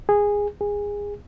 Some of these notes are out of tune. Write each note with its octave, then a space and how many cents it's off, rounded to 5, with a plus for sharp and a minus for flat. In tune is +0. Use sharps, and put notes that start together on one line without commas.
G#4 -15
G#4 -20